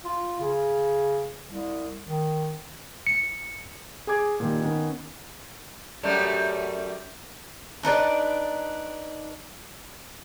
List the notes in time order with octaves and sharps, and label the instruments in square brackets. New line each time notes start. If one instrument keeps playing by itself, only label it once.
[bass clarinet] F4
C#3
C2
D#3
[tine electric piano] C#7
[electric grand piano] G#4 G#5 D6 G#6
A#2 D#3 G3
D#3 B3 C#4
[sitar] F#2 G3 A3
[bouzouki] D4 D#4 B4 D5